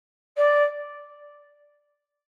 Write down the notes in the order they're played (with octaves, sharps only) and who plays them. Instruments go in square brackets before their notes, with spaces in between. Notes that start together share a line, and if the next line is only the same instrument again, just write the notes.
[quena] D5